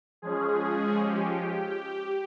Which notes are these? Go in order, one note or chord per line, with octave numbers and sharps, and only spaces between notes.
F3 G#3 C#4 G#4
G4